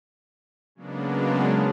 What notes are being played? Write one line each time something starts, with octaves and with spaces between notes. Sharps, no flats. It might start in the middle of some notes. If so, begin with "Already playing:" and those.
C#3 F#3 G#3 A#3 B3 D4